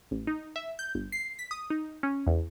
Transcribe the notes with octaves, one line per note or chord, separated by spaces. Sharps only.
A1
D#4
E5
G6
G1
C7
B6
D#6
D#4
C#4
E2